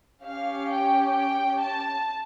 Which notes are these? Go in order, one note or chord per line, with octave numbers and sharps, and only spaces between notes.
C#4 G4 F5
G5
G5
A5